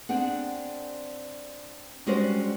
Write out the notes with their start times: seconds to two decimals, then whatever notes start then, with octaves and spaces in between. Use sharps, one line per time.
0.09 C4 D4 G#4 F#5
2.07 G3 G#3 C#4 D4 F#4 C5